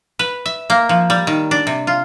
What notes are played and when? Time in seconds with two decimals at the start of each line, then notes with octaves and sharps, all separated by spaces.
0.19 B4
0.46 E5
0.70 A#3
0.89 F3
1.10 G3
1.27 D#3
1.51 D4
1.67 C3
1.87 F4